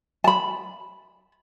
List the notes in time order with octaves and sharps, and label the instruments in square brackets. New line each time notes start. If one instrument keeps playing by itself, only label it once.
[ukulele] A5 B5